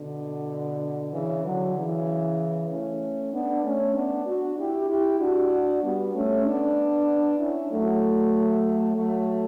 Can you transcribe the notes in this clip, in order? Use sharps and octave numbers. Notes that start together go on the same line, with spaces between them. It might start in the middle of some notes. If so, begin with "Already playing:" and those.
Already playing: B2 D3
C#3 E3
D3 F#3
C#3 E3
A3 C#4
B3 D4
A3 C#4
B3 D4
D4 F#4
E4 G4
E4 G4
D4 F#4
G3 B3
A3 C#4
B3 D4
C#4 E4
F#3 A3
F#3 A3